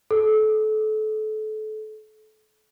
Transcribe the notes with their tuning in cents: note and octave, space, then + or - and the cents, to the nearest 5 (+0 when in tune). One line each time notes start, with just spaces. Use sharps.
A4 -30